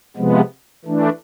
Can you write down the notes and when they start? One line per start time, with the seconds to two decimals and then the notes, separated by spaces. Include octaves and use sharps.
0.17 C3 F3 G#3 B3
0.85 E3 A3 D4